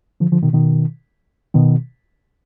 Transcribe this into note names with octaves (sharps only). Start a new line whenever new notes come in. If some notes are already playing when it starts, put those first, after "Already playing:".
D3 F3
D3 F3
B2 D#3
B2 D#3
B2 D#3